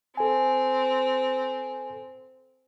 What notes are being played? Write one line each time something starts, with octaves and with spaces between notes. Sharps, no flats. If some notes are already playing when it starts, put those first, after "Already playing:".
C4 A4 G#5